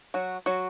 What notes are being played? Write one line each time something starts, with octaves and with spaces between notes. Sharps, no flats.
F#3 F#4
F#3 F#4